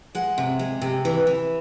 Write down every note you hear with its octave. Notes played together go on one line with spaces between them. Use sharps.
G#3 F#5
C3
G#3
C3
E3
E3